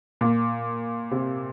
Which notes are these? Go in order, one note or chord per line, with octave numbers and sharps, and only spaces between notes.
A#2
C3